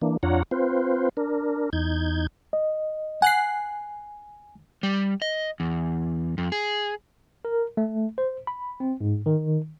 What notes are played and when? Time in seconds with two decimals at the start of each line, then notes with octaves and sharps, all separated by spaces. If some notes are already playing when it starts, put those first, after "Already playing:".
0.02 E3 A#3 D4
0.23 F2 D4 F4 C#5 F#5 A#5
0.51 C4 F4 B4 C5
1.17 D4 A#4
1.73 E2 D#4 G6 G#6
2.53 D#5
3.22 F#5 G#5 F#6 C7
4.83 G3
5.22 D#5
5.60 E2
6.38 F2
6.52 G#4
7.45 A#4
7.77 A3
8.18 C5
8.47 B5
8.80 C4
9.01 G#2
9.26 D#3